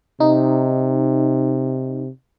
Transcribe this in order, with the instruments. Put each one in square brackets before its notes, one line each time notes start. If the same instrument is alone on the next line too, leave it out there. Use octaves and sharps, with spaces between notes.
[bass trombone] C3 [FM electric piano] D#4